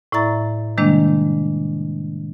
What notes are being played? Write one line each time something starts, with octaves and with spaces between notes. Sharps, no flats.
A2 E4 D5 E5 A#5 A6
C3 D#3 G3 G#3 A#3 D4